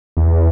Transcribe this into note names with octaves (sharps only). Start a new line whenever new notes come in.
E2